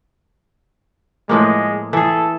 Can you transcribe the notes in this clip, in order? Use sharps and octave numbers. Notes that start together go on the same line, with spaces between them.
A2 F3 G#3 A#3
E3 G#4 A4